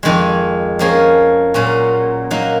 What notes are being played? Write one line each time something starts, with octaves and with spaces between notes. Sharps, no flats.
F2 D#3 G#3
F3 A#3 C#4 G#4
A#2 F#3 C#4
F#3 A#3 D#4